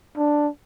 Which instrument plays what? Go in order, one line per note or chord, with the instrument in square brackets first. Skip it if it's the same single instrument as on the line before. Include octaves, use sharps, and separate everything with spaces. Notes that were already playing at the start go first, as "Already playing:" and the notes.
[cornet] D4